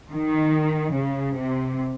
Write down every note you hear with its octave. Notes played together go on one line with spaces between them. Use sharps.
D#3
C#3
C3